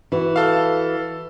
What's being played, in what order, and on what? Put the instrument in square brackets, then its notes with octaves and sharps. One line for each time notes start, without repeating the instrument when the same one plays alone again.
[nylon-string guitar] E3 F#4
[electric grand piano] A4 F5